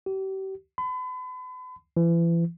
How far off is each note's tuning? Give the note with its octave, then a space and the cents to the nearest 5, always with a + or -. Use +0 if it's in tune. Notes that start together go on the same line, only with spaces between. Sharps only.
G4 -35
B5 +40
E3 +35